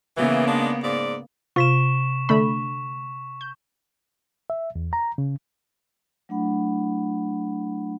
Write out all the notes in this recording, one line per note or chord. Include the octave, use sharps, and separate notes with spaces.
C#3 E3 A#3 B3
G#3 D4
G#2 D5
C3 F4 C#6 B6 E7
D3 A3 B5 C#6
G6
E5
E2
A#5
C#3
F#3 A3 D4 E4 F#5 B5